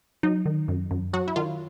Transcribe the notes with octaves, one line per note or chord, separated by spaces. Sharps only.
F#3 D#4
D#3
F#2
F#2
F#3 F#4
E4
D#3 F4